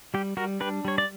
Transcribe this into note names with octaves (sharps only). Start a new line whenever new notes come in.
G3 G4
G3 F#4 A#4
D4 G4 B4
G3 C#5
D5